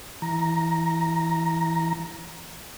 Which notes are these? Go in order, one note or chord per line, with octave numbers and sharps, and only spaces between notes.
E3 A#5